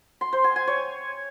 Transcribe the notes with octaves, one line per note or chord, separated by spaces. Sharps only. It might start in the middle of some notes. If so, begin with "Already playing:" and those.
C6
C5
G#5
G#5
C#5